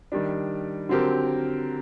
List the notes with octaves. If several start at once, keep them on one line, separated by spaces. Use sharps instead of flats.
D#3 G3 D4
D3 F#3 C4 G4 A#4